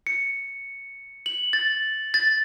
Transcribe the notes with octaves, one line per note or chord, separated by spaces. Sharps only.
C#7
F#7
A6
A6